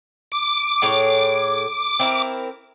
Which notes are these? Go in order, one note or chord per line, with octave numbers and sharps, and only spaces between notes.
D6
A2 G#4 C#5
C4 E4 A#4